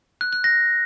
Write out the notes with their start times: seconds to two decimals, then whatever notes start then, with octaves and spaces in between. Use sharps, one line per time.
0.21 F#6
0.33 F#6
0.44 A#6